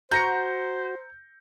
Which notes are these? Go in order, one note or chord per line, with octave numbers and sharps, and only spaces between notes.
F#4 C5 A#5 G6 A#6 C#7